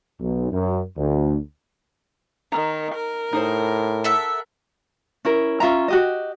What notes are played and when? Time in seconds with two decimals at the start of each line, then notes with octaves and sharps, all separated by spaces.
0.21 B1
0.52 F#2
0.97 D2
2.52 D#3 A#5
2.95 A#4
3.33 A2 D#4 G#4 C5
4.04 A4 E5 F#5
5.25 C#4 E4 A#4
5.60 C#4 F4 E5 A#5
5.88 F#4 G4 D#5